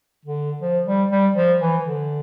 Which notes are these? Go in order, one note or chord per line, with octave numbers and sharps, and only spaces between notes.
D3
F3
G3
G3
F3
E3
D3